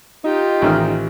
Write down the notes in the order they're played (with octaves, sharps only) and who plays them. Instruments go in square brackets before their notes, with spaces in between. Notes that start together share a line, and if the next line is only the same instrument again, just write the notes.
[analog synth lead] D#4 [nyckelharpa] F4 G4
[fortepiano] A1 D#3 F6